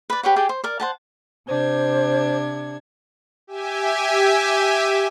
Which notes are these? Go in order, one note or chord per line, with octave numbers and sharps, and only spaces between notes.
B4 D5
G4 B4 C#5 F#5
G4 G#4 D5 G5
C5
A#4 D5
C5 F#5 A5
C3 D4 C5 G#6
G4 E5 G#5